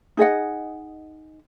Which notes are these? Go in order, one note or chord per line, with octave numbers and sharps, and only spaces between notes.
D#4 G#4 D#5 F#5